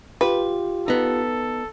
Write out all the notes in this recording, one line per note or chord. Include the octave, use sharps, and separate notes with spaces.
F4 G4 B4
B3 D#4 A4